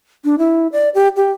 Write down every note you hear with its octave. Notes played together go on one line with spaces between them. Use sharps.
D4
E4
D5
G4
G4